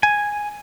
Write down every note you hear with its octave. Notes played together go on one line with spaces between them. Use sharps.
G#5